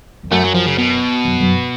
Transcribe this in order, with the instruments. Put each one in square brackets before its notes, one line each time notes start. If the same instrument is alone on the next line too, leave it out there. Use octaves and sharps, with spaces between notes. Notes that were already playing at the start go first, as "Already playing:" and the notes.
[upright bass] F2
[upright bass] F#2 [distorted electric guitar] A3
[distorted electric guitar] F#3
F3
C#3
B2
[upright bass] F#2
F#2